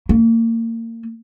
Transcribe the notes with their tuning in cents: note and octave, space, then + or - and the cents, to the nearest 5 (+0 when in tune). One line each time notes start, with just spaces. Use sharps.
A#3 -35